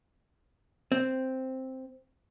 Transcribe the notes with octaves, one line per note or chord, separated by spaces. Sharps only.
C4